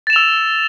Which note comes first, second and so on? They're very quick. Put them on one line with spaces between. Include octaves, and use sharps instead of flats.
A6 E7 F7 E6